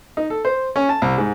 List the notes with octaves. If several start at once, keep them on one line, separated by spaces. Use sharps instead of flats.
D#4
A4
C5
C#4
A5
C2
G#2